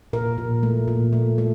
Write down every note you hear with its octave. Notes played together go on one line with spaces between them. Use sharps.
A#2 A#4
A#2
A3
A#2
A3
A3